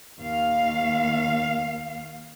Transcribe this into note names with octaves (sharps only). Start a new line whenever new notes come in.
D#2 F5